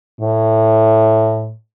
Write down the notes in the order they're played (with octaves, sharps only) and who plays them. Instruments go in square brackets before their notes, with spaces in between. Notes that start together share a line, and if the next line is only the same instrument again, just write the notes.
[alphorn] A2